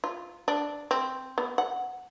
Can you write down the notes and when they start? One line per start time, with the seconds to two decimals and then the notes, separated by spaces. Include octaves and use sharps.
0.04 F4
0.48 D4
0.91 C4
1.38 B3
1.58 F#5